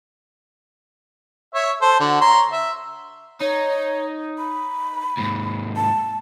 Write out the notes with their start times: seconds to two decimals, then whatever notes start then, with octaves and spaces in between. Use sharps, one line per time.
1.55 C#5 E5
1.82 A4 C5
2.00 D3 F#4
2.21 C#5 A#5 C6
2.52 E5
3.41 D#4 C#5
4.38 B5
5.18 D#2 G#2
5.76 A5